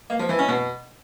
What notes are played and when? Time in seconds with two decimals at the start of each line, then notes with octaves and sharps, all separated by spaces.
0.10 A#3
0.19 F3
0.29 E3
0.39 C#4
0.48 B2